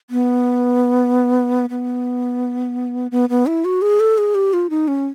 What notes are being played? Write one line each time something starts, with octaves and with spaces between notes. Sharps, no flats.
B3
B3
B3
B3
E4
F#4
G#4
A4
G#4
G4
F4
D#4
C#4